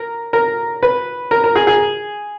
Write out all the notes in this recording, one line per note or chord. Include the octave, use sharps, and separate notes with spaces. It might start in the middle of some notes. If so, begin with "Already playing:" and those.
Already playing: A#4
A#4
B4
A#4
A#4
G#4
G#4